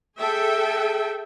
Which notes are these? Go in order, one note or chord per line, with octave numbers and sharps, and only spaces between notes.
G#4 A4 E5 G5